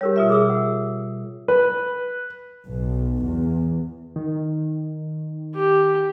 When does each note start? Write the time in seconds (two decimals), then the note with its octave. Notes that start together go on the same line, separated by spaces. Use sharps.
0.01 G3 G4 A#4 C#5
0.16 B2 F4 E5
0.30 G#4 D#6 E6
0.50 F#5
1.48 B4
2.67 B1
3.25 E2
4.16 D#3
5.55 G4